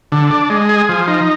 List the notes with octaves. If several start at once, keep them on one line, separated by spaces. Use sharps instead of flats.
D3
D4
G#3
G#4
F3
D#4